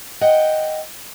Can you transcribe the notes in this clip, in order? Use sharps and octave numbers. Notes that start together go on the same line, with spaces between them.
D#5 F#5 G5